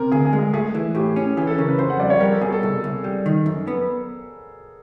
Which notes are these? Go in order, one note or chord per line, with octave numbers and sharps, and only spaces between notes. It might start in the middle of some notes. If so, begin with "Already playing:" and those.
Already playing: C3 A#4
D2 G#4
G#4
G#3
G#4
A3 G#4
E3
A2 G4
C#4
E3 G#4
A4
C#3 A#4
B4
F2 C5
F#5
G3 D5
C#5
G3 A#4
A4
B2 G#4
A4
C2 A4
C2
G3
D#3
F#2
B3